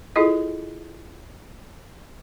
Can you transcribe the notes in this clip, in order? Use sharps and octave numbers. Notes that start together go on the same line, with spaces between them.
E4 F4 G#4 A4 D#5